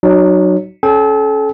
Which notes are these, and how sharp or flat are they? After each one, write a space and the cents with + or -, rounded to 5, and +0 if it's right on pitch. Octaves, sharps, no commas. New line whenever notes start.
F#3 +0 D#4 -40
C#4 +0 A4 -35 G5 +20